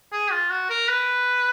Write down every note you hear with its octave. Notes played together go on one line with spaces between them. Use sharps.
G#4
F4
F#4
A#4
B4